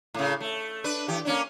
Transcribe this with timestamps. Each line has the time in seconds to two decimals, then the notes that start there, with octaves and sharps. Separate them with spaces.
0.14 A2 C#3
0.41 A3
0.84 D4 B4
1.08 E3 G4
1.25 A#3 C#4 D4